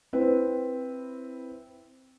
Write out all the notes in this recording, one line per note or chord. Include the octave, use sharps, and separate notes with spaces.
C4 E4 B4 C5